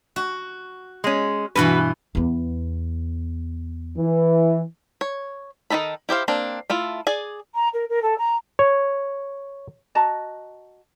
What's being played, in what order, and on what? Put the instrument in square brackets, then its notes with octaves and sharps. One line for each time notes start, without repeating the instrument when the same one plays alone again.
[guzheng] F#4
[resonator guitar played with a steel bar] G#3 C#4
[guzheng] G2 B2 E3 [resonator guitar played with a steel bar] F#4 B4
[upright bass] E2 B3
[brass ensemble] E3
[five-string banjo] C#5
D#3 C4 D#4 A4 B5
E4 G4 C5 F5
A#3 C4 D4
A3 E4 F4
G#4 D5 G#5
[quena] A#5
A#4
A#4
A4
A#5
[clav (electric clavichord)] C#5
[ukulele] F#4 D#5 A5 A#5